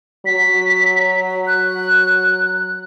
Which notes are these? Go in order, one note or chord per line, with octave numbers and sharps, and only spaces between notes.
F#3 B6
F#6